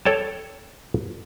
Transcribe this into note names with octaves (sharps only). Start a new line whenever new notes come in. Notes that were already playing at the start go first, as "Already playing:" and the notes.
A4 C#5 G5 A5